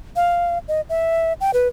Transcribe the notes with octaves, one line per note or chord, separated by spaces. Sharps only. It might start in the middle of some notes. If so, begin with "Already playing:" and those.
F5
D#5
E5
G5
B4